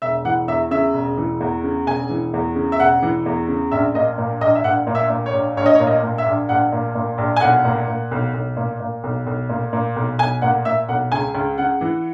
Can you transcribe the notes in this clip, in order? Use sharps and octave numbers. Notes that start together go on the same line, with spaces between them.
E1 E5
E3 F#5
E2 E5
C#3 E5
E1
E3
E2
C#3
E1 G#5
E3
E2
C#3
E5
E1 F#5
E3
E2
C#3
A#1 E5
A#2 D#5
A#2
A#1 D#5
E5
A#1 F#5
A#2
E5
A#2
C#5
A#1
A#1 C#5
D#5
C#5
A#2
D#5
A#2
E5
A#1
A#1 F#5
A#2
A#2
A#1
G#5
B1 F#5
A#2
A#2
B1
B1
A#2
A#2
B1
B1
A#2
A#2
B1
B1 G#5
A#2 F#5
A#2 E5
B1 F#5
C#2 G#5
C#2
C#3 F#5
E3